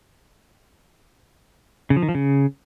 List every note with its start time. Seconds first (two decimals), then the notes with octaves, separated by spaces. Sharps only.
1.90 C#3
1.96 F3
2.02 D#3
2.09 F3
2.15 C#3